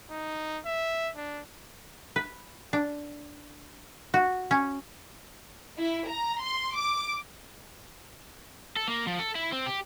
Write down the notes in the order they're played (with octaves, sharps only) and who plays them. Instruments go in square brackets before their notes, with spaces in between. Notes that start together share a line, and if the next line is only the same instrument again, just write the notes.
[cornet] D#4
E5
D4
[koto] B4
D4
F#4
C#4
[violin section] E4
A#5
C6
D6
[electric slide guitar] A4
A#3
F3
A4
E4
C4
G4